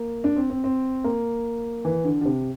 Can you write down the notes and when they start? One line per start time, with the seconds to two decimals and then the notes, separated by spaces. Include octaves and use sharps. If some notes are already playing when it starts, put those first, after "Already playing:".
Already playing: A#3
0.24 D4
0.36 C4
0.50 C4
0.64 C4
1.04 A#3
1.85 E3
2.04 D3
2.21 D3
2.25 C3